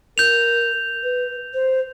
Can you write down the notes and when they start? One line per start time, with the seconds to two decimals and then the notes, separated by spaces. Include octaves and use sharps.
0.18 A#4 G6 F7
1.03 B4
1.54 C5